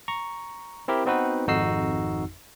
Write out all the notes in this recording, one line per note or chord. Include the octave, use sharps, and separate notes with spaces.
A#5 C#6
C4 E4 G4 A#4
B3 C4 D#4 F#4 B4
G#1 F2 D#4 F#4 E6 C7